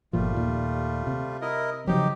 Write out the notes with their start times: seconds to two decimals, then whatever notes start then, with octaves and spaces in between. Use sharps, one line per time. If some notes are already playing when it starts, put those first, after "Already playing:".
0.13 G1 A#2 F3 G3 A3 F4
0.33 D#2 A#2
1.07 C3
1.42 E4 A#4 D#5
1.87 C#3 F3 F#3 D#4 G4